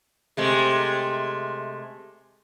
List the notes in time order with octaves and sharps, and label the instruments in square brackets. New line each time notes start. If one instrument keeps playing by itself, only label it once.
[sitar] C3 G#3 A3